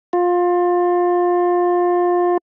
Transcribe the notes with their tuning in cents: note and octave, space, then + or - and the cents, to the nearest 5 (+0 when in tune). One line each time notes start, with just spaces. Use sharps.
F4 +20